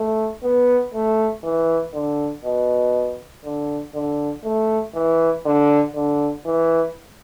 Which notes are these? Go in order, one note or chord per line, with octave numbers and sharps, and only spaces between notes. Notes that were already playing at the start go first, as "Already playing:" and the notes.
Already playing: A3
B3
A3
E3
D3
B2
D3
D3
A3
E3
D3
D3
E3